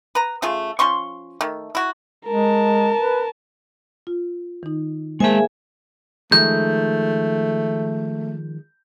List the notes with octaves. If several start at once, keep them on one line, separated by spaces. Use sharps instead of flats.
B4 A#5
C#3 A3 F4 G#4
F3 C#4 C6 C#6
D#3 A3
E4 F#4
G#3 A#4 A5
B4
F4
D#3 D#4
G#3 A#3 G#4 C5 E5 G#5 A5
D#3 F3 G#3 A3 G6